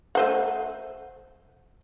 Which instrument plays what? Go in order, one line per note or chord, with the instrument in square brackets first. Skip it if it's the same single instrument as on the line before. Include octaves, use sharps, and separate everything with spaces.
[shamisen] A3 C5 F#5